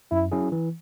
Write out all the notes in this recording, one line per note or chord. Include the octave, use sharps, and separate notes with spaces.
F#2 E4
F#3 C#4 E4 G#4
E3